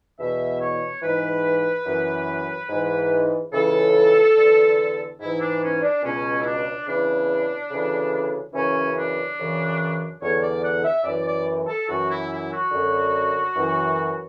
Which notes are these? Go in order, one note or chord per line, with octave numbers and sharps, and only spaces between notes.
E2 B2 E5
C#5
G#2 E3 B4
F#2 E3
G#2 E3
C#2 C#3 E3 A4
E2 D3
G#2 E3 E4
D4
C#4
D4
C#2 B2 C#4
E4
D4
E2 C#3 E3 D4
D2 C#3 E3
F#2 C#3 E3 C#4
D4
F#2 C#3 E3
E2 D3 C#5
D5
F#5
E5
F#2 E3 D5
D5
A4
F#2 E3 F#4
E4
E4
F#4
F#2 D3
F#2 E3